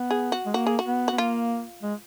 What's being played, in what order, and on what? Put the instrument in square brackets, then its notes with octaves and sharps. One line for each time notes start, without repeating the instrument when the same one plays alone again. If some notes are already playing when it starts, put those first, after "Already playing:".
Already playing: [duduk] B3
[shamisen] G#4
F#4
[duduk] G#3
[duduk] A#3 [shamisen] F#4
[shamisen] G#4
F#4
[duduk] B3
[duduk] B3 [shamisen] F#4
[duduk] A#3 [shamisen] F4
[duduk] G#3